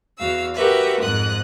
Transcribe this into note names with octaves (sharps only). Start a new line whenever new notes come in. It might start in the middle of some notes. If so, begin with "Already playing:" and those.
E2 F#4 F5 E6
F#4 G4 A#4 B4 E5
F2 G#2 D#6 F#6